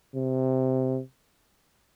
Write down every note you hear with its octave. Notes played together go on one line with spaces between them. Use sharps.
C3